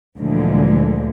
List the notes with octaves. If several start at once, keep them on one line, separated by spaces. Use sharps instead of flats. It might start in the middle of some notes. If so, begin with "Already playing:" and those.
D2 A#2 D3 E3 F3 G#3